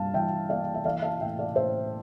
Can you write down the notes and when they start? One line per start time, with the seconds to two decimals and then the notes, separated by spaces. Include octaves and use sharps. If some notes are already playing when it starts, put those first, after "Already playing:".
Already playing: G2 A#3 F5 A5
0.14 E3 E5 G5
0.49 A#3 D5 F5
0.74 E5
0.84 E3 D5 F5
1.02 F5 A5
1.20 A2 E5 G5
1.39 D5 F5
1.55 A2 C5 E5